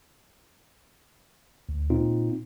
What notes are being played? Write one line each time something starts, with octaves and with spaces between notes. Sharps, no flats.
D2
A#2 C4 D#4 F4